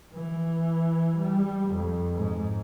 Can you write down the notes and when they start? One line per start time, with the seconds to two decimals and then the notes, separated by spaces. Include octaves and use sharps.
0.13 E3
1.17 G3
1.68 F2
2.14 G#2